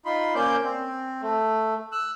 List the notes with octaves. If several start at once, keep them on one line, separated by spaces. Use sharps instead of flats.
D#4 F4 B5 C6
A#3 C#4 C5 D5 G6
C4
A3
E6 F#6